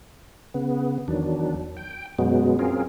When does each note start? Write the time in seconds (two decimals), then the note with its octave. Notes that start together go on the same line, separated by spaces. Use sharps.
0.54 C#3 B3
1.08 E2 D#3 F#3 D4
1.77 G5
2.19 F#2 B2 F#3 G#3 B3
2.59 C4 C#4 F4 G#4 A#4